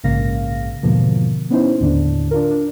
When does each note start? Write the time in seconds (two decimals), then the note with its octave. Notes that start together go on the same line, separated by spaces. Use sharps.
0.04 A#1 G#2 C#3 A#3 F5 A#6
0.83 E2 G#2 B2 D3 F3 A#3
1.50 B3 C#4 D#4 E4 C5
1.80 D#2 A2 D3 D4
2.31 D4 F4 A#4
2.51 D4